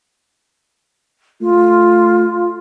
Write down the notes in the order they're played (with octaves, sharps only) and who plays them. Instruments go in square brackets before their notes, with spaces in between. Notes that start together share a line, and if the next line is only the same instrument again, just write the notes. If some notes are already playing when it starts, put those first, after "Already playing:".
[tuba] A3 [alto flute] F4